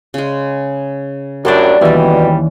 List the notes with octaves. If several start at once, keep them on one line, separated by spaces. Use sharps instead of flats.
C#3 G#3
F#2 A2 F#3 G3 D4 C5 D5
D#2 B2 E3 G3 C#4 D5 E5